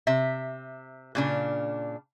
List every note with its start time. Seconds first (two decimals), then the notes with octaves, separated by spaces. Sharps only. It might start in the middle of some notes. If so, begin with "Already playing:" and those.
0.07 C3 E5
1.15 A#2 C#3 D4